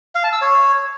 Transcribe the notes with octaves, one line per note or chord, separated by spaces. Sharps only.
F5
A5
E6
C#5